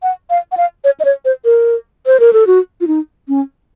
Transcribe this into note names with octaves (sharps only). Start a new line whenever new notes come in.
F#5
F5
F#5
F5
C#5
D#5
C#5
C5
A#4
C5
A#4
A4
F#4
F4
D#4
C#4